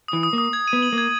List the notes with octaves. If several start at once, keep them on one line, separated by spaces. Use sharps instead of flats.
E3 D#6
D#6
A#3
D#6
G#6
D#7
B3
F#7
A#3
G#6